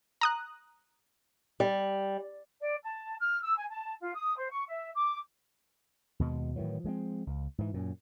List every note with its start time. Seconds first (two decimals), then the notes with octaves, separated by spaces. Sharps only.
0.21 A#5 D#6 F#6
1.60 G3
2.61 D5
2.84 A5
3.20 F6
3.42 E6
3.56 G#5
3.69 A5
4.01 F4
4.14 D#6
4.37 C5
4.50 C#6
4.67 E5
4.94 D6
6.19 D#2 B2 G#3
6.56 A2 D#3 E3 F#3
6.84 F3 G#3 A#3 C4
7.27 C#2
7.58 G#2 E3
7.74 F#2 A#2